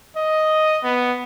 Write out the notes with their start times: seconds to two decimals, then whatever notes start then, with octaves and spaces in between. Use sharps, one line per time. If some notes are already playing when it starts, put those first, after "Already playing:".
0.16 D#5
0.83 B3